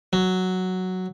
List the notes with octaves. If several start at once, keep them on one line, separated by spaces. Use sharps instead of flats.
F#3